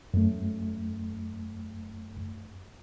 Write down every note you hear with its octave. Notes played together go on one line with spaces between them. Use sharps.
F#2 A3